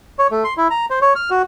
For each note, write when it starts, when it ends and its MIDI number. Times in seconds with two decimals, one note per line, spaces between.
0.19 0.27 73
0.31 0.44 57
0.44 0.54 84
0.57 0.68 64
0.70 0.86 82
0.90 0.99 72
1.02 1.14 73
1.16 1.30 89
1.30 1.42 66